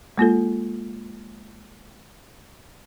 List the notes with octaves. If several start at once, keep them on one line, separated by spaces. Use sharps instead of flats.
G#3 A#3 F4 A4